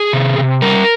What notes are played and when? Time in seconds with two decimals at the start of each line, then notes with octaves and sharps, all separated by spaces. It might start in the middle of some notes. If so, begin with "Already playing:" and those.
Already playing: G#4
0.13 C3
0.38 C3
0.62 G3 A#4